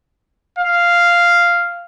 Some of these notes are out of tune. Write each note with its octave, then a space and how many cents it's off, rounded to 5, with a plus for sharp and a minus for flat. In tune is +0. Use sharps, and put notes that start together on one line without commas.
F5 -5